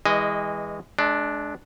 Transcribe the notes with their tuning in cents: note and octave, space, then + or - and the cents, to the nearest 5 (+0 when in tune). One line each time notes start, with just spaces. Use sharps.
E3 -15 G#3 -25 D#5 +0
G#3 +35 D4 +0